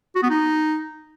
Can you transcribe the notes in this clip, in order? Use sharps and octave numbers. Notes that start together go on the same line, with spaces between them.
F#4
B3
D#4